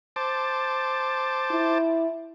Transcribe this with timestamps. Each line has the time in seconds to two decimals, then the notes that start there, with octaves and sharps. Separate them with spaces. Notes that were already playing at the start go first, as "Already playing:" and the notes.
0.16 C5 A5 D6
1.51 E4